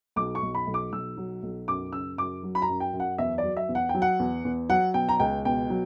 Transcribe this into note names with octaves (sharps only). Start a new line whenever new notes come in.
B1 D6
C#6
B1
B5
B1
D6
B1 E6
F#3
B1
F#2 D6
C#3 E6
F#2 D6
F#3
B5
A#5
F#2
G5
F#2
F#5
E2 E5
D5
F#3
E5
E2
F#5
G5
F#3
F#5
E2
E2
F#3 F#5
B2 G5
A#5
C#2 G5
B2 G5
F#3